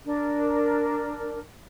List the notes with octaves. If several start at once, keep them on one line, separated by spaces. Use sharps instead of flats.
D4 A#4